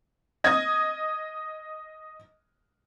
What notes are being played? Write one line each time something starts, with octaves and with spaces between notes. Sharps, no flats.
D#5 G#6